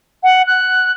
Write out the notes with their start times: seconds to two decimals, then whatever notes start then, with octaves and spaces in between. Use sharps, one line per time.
0.23 F#5
0.47 F#6